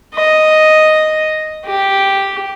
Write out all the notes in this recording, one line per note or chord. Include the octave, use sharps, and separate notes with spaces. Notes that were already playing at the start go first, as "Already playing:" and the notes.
D#5
G4